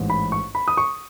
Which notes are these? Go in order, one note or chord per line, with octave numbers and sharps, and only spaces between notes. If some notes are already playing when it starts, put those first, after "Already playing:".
Already playing: A1 G#2
B5
C#6
B5
D#6
C#6